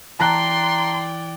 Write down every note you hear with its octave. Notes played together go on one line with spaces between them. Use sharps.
E3 D5 G5 A5 A#5 C6 F#6